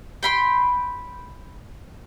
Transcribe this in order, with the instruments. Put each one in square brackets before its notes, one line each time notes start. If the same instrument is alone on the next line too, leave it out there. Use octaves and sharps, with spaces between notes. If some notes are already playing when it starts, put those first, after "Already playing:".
[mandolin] G5 B5 C6